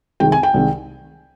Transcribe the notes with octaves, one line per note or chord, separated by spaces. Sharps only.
C2 C3 D#3 G#3 G5
G#5
G5
C2 C3 D#3 G#3